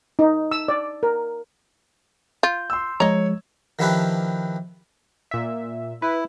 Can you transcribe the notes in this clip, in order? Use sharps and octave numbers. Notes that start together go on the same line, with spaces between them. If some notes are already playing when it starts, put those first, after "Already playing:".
D#4
E6
D5
A#4
F4 G6
C6 E6
F3 G#3 C#5 D#5 A#5
D#3 F3 D4 E4 G4 B4
A#2 E5
E4 B4